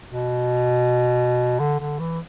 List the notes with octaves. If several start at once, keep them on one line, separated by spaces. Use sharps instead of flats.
B2
D3
D3
E3